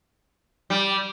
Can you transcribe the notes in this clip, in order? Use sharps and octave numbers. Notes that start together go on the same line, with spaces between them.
G3